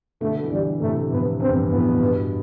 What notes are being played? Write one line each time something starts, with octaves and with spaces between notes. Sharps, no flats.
B2 D3 A3
E3
B2 D3 G3
A2 C3 A3
F2 A2 B3
E2 G2 C4
F2 A2 B3
G2 B2